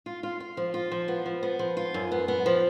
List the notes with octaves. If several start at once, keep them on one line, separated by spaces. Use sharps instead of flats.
F4
F4
F4
F3
F4
F3
B3
F3
B3
F3
F4
F#2
B3
B3
F3